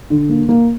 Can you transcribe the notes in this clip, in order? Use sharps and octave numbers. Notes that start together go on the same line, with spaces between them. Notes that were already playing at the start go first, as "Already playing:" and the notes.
D3
A#3
A#3